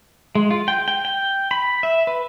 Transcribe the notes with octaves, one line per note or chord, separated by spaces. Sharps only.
G#3
F4
G5
G5
G5
B5
E5
B4